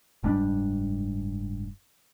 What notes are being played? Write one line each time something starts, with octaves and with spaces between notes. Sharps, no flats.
F#1 G#2 G3 D4